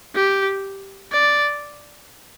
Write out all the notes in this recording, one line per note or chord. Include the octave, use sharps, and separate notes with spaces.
G4
D5